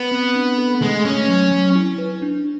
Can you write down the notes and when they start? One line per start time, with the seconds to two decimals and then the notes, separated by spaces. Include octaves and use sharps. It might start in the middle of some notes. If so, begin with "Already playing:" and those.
Already playing: B3 B4
0.12 C4
0.35 D4
0.58 A4
0.82 G#3 A3
1.05 A3 C#4
1.29 F#3
1.51 F#3
1.75 E4
1.98 B4
2.22 D4